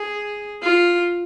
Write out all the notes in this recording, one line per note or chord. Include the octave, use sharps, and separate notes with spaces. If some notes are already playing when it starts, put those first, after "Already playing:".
Already playing: G#4
F4